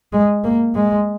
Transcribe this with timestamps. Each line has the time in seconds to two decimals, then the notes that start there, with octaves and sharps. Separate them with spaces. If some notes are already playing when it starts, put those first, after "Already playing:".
0.13 G#3
0.44 A#3
0.75 G#3